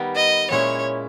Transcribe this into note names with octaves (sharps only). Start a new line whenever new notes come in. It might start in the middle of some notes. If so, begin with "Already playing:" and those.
Already playing: D#3 G3 B3 D#4 G4 A#4
D#5
A#2 G#3 C#4 E4 C#5